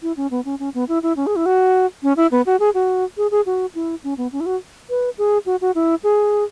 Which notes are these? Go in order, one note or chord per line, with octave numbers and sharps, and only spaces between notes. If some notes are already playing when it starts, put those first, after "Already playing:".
E4
C#4
B3
C#4
C#4
B3
E4
E4
C#4
G#4
E4
F#4
C#4
E4
B3
F#4
G#4
F#4
G#4
G#4
F#4
E4
C#4
B3
C#4
E4
F#4
B4
G#4
F#4
F#4
E4
G#4